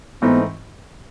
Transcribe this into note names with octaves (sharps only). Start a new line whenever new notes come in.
G#2 E3 A3 B3 C4 D#4